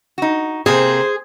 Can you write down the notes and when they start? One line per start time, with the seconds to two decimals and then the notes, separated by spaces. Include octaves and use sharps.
0.18 D#4 F#4
0.66 C3 A#3 C4 G#4 C5